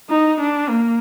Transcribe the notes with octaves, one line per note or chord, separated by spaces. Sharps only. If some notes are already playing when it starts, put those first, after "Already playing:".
D#4
D4
A#3